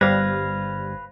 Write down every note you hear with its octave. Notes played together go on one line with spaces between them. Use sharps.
G1 G3 B4 C5 F5 G#6 A#6